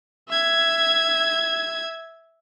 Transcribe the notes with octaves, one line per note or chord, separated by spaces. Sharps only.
E5 G#6